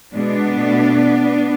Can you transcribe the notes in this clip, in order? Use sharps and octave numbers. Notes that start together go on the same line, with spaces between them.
B2 G#3 B3 D4
B2 A3